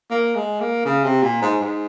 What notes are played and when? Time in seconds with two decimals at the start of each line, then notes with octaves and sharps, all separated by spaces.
0.11 A#3
0.35 G#3
0.60 A#3
0.85 C#3
1.04 C3
1.23 A#2
1.42 G#2
1.60 G#2